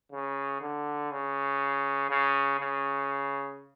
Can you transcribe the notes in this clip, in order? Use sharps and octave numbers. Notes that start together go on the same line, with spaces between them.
C#3
D3
C#3
C#3
C#3